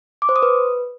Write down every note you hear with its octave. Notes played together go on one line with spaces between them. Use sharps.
D6
C5
D#6
B4